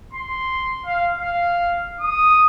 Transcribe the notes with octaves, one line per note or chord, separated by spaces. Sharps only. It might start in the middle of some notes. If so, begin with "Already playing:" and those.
C6
F5
F5
D#6